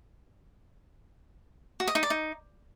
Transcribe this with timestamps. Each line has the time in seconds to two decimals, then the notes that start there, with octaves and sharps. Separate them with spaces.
1.80 F#4
1.88 D#5
1.95 D#4
2.03 D5
2.10 D#4